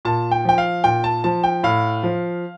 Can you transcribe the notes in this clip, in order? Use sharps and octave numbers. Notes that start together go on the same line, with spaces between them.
A#2 A5
G5
F3 G5
F5
A#2 G5
A5
F3 A5
G5
A2 F5
F3